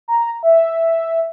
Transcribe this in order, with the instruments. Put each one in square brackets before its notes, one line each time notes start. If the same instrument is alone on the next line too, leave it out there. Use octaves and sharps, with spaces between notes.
[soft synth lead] A#5
E5